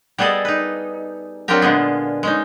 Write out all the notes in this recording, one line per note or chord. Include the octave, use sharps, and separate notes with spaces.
G3 B3 G#4 A4 D5 D#5
D#4 B4
F#3 C4 D4 F4 G4 A#4
A#2 D3 G#3 B3 G#4
G#3 C#4 D#4